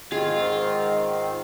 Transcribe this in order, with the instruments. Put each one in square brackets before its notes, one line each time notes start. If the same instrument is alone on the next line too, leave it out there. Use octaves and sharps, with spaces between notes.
[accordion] G#2 D#3 C4 [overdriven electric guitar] F4 [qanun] G#4 [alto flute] D#5